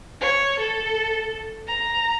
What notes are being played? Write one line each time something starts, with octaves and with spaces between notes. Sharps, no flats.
C#5
A4
A#5